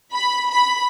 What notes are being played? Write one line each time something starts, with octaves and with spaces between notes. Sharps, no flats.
B5
B5